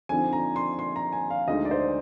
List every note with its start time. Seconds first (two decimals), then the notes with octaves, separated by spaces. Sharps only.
0.09 F2 D3 F3 C4 D#4 G#5
0.33 A#5
0.56 C6
0.79 C6
0.96 A#5
1.13 G#5
1.30 F5
1.48 D2 D3 G#3 D#4 D#5
1.65 D5
1.71 C5